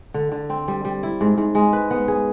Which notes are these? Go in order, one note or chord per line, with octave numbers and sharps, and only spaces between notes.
D3
D3
C4
G3
G3
E4
G#2
G#2
G#3
B4
B3
G#4